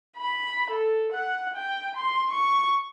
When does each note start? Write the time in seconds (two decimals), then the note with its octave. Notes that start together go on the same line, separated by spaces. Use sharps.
0.17 B5
0.70 A4
1.12 F#5
1.56 G5
1.96 C6
2.31 C#6